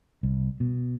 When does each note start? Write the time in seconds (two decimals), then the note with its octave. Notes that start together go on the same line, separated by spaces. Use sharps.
0.23 C2
0.60 B2